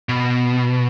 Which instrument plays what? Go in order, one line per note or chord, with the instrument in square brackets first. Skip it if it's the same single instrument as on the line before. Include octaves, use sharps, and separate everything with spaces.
[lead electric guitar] B2